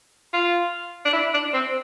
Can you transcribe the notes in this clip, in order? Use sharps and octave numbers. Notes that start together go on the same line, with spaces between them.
F4
D4
E4
D4
C4